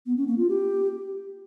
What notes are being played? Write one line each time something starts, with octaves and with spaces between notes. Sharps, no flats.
B3
C#4
A#3
F4
G4